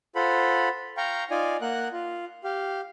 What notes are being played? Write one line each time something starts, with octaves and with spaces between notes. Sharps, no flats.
F4 A4 C5 F#5 B5
F5 G5 A#5 C#6
D#4 F4 D5 G#5
A#3 A#4 F#5 F#6
F4
G4 F5